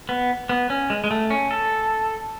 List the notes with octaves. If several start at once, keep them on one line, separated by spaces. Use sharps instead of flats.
B3
B3
C#4
G#3
G#3
A3
C#4
A4